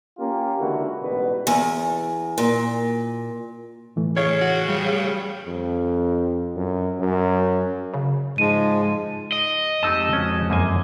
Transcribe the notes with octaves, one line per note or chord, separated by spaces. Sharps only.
A#3 C#4 F4 G4
C#2 D3 E3 F#4 A#4
A1 G#2 B2 G3 B4
E2
A#2
A2 E3 A3
C#3 C#5
F#4
G3
F2
F#2
F#2
C#3
G#2 F3 G#3 D#7
D#5
F2 G#3 A3 D#4 G4 A5 E6
C#4 F#4
F#2 A#3 G#5